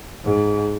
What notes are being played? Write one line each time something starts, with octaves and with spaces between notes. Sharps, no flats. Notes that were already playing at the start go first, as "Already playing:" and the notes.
G#2